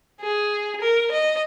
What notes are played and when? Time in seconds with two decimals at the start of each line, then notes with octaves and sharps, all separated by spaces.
0.21 G#4
0.81 A#4
1.11 D#5